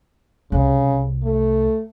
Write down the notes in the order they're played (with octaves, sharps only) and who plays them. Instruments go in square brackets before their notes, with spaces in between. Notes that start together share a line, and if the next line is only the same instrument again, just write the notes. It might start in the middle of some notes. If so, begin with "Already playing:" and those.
[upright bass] C2 [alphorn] C#3
[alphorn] A3